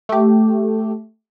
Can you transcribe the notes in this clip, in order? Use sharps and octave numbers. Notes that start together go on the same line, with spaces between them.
A3 G4